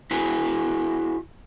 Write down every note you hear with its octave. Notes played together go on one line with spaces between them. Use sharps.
E4 F#4 G#4 B4